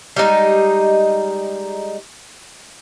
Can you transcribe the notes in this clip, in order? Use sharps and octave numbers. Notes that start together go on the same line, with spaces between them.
G3 G#3 D#4